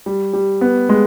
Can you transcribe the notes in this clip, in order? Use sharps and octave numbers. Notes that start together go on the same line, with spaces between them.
G3
G3
B3
G#3